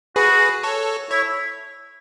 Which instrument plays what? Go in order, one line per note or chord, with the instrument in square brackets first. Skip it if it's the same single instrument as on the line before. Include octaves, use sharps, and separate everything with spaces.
[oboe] F#4 [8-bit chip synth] G#4 B4
[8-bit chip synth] A4 C#5
[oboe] E4 [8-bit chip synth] C#5